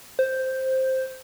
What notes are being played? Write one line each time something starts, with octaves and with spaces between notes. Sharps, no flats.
C5